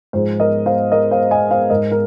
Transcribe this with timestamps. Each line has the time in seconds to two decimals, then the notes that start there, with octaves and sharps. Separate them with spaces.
0.13 G#2 F3 G#3 C5
0.40 A#4 D#5
0.66 C5 F5
0.92 A#4 D#5
1.11 C5 F5
1.31 D#5 G#5
1.51 C5 F5
1.70 G#2 G#3 A#4 D#5
1.92 A#4